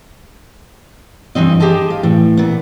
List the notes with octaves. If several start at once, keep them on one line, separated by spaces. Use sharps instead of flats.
G2 C3 E3 C4 D#5
G4 G#4 C5 D#5 A5
F5
A2 E3
A#2 B3